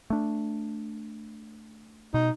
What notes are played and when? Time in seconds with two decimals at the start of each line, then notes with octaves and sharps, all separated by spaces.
0.10 A3 D4
2.14 B2 D#4